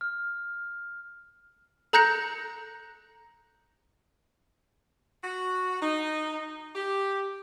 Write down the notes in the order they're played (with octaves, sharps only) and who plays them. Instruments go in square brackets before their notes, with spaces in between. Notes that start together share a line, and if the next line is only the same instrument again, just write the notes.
[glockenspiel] F6
[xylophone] A4 A#5 F#6 G6 A#6 C#7
[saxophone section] F#4
D#4
G4